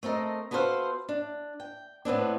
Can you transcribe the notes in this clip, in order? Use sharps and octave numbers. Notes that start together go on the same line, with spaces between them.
A3 C4 A4 A#4 D#5
B3 F#4 A4 B4 C5 F5
D4
G5
A2 B3 C4 D4